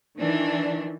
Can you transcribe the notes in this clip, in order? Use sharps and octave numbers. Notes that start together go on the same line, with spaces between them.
D#3 E3 D4